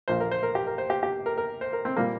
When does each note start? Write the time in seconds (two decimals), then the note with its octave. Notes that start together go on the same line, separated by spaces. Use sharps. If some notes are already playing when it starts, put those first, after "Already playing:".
0.08 A#1 A#2 F3 A#3 C5
0.20 A#4
0.31 C5
0.43 A#4
0.55 G4
0.67 A#4
0.78 C5
0.90 G4
1.03 G4
1.26 A#4
1.38 A#4
1.61 C5
1.73 A#4
1.85 C4
1.96 A#2 G3 A#3